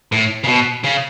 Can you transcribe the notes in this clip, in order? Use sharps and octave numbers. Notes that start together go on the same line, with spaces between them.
A2
C#3
B2
C#3